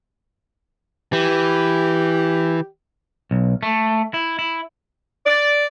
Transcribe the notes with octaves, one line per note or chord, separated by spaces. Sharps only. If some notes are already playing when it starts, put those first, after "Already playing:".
E3 G4
B1
A3
E4
E4
D5